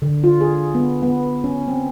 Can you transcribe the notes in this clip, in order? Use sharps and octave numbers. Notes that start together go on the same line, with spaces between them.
D3
F4
G#4
B3
B3
C#4
C4